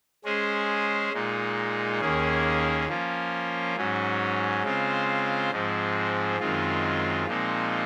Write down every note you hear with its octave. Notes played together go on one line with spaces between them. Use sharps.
G#3 C#4 G#4 C5
A#2 G#3 D#4
D#2 D#3 A#3 C#4 G#4
F3 A#3 C#4 F4
G#2 F#3 C#4
C#3 G#3 C4 F4 C5
G#2 F3 G#3 C4
F#2 D#3 G#3 C4 F4
A#2 F3 G#3 C4 D#4